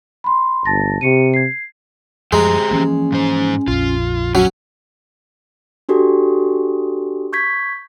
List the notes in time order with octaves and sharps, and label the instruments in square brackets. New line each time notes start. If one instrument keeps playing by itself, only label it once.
[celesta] B5 C6
[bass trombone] G1 [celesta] A5 A6 A#6
[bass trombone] C3 [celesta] G4 C#7 D#7
[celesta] G#6 C7
[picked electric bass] F#2 F3 G3 [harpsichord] G#3 [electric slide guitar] G4 C5 A#5
[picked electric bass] E3 F3 A#3 [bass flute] C#4
[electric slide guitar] G#2 C5
[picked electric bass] A#1 F2 [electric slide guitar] F4
[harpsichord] F#3 [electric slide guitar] C#4 C#5
[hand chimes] D4 F#4 G4 A4
C#6 G6 G#6 B6